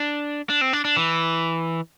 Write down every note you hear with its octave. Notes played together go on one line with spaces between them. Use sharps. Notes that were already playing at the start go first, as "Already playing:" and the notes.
Already playing: D4
D4
C4
D4
D4
E3